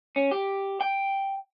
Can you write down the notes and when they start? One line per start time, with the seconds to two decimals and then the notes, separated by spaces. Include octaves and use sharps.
0.16 C#4
0.31 G4
0.81 G5